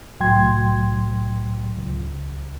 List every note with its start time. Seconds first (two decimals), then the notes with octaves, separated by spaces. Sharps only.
0.20 C2 A2 F#3 G5 C6 G#6
1.78 C#2